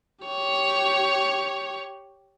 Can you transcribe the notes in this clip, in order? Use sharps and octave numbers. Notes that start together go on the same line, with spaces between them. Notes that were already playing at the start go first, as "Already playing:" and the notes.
G4 C#5